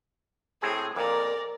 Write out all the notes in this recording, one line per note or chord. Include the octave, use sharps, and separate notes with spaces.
A2 C4 G#4 G#5
F2 A#2 A#4 D5